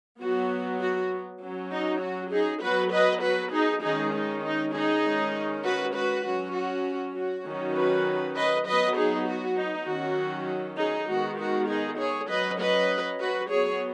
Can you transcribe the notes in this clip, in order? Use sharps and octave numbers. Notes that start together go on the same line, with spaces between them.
F#3 B3 F#4
F#4
F#3 C#4
D#4
F#4
D#4 G#4
F#3 B3 F#4 B4
B4 D#5
F#4 B4
D#4 G#4
D#3 G#3 C#4 D#4 G#4
D#4
D#4
D#4 G#4
D#3 G#3 C#4
F#4 B4
F#4 B4
F#3 C#4 F#4
F#4
F#4
D#3 F#3 C#4
F#4 B4
B4 D#5
F#3 B3 B4 D#5
D#4 G#4
F#4
D#4
D#3 F#3 C#4 F#4
D#4 G#4
D#3 G#3 B3 F#4
F#4
D#4 G#4
G#4 C#5
F#3 C#4 B4 D#5
B4 D#5
F#4 B4
F#3 B3 G#4 C#5